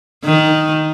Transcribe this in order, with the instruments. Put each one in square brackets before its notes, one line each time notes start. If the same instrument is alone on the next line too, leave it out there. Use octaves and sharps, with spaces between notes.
[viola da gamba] D#3